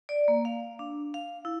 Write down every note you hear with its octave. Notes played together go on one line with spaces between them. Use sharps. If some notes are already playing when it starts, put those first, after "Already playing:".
D5
A#3
F5
D4
F5
E4